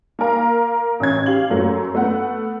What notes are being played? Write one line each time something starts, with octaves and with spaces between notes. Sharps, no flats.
A#3 A#4 F5
A1 C#4 G#6
G4 F5 F#7
F#2 F#3 A3
A3 B3 F#5